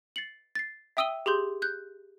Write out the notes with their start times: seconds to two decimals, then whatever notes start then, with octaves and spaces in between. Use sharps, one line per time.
0.16 A6 C7 C#7 F#7
0.55 A6 C7
0.97 E5 G5 D#6 E6 D#7 G7
1.26 G4 G#4 C6 G6
1.62 F#6 G6